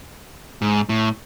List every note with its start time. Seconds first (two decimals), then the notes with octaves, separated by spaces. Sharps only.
0.62 G#2
0.89 A2